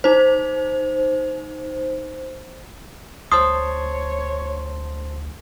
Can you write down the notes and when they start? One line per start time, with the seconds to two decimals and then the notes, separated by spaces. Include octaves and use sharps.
0.04 D#4 C5
3.32 D2 C5 C#5 A5 C6 D#6